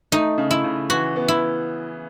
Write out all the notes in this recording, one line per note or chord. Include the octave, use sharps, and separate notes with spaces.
A3 D#4
C#3
E4
C#3
E3 F#4
B3
E4